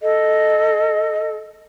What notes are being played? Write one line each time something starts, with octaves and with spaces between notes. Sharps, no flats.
A4 D#5